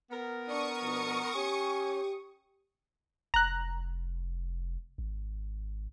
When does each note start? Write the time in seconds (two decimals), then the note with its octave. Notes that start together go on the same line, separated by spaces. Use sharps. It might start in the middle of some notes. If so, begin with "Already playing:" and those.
0.11 B3 A#4
0.48 D4 C#6 D#6
0.82 B2 F3 D4
1.35 C#4 G4 C#5
3.34 F1 A#5 F#6
4.98 G#1